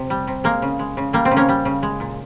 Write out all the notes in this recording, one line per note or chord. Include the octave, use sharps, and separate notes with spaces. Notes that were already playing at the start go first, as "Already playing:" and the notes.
Already playing: C3
G3
C3
G#3 A#3
C#3
G#3
C#3
G3 A#3
C4
C#3
A#3 C#4
G3
C#3
G#3
A#2